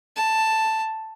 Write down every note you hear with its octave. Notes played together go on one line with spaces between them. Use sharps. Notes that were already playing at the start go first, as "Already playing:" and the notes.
A5